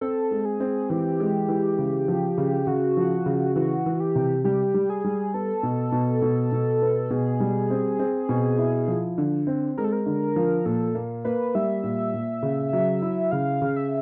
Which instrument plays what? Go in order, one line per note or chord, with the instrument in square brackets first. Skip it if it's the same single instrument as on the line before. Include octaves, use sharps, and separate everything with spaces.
[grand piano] C4 [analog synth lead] A4
[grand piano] G#3
[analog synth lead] G#4
[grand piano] C4
[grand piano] E3 [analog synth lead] G4
[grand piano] G#3
E3
C#3
F3
C#3
[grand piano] C#3 [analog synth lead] F#4
[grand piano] F3
C#3
[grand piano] E3 [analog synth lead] F#4
[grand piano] E3
[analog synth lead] G4
[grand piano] C3
[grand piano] G3 [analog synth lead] G4
[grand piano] G3
[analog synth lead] G#4
[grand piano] G3
[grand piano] B3 [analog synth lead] A4
[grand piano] B2
B2
B2
B2
B3
[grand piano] B2 [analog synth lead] G#4
[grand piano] G3
C4
C4
B2
E4
F3
D3
C4
[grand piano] G#3 [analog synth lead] A#4
[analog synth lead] A4
A#4
[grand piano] D3
F3
[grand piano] A#2 [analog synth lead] A4
[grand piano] A#3
[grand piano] A#3 [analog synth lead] B4
[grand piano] G3 [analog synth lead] E5
[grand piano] A#2
A#2
C#3
F#3
E4
[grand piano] C#3 [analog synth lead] F5
[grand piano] C#3
[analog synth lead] E5